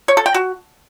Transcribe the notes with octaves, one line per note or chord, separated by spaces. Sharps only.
C#5
A4
G5
F#4